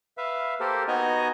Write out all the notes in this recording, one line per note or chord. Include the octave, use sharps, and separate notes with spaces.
B4 E5 F5
A#3 G4 A4 A#4 C5
B3 D#4 F#4 D#5 G#5 A#5